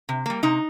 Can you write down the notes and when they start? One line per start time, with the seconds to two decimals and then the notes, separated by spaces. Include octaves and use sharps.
0.09 C3
0.26 G3 A#3
0.43 C3 D#4